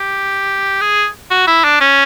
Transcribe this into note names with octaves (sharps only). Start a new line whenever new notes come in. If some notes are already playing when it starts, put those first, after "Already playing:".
Already playing: G4
G#4
F#4
E4
D4
C#4